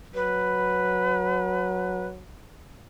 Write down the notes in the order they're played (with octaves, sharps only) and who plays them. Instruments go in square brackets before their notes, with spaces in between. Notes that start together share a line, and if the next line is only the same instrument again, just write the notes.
[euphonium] F#3 [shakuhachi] B4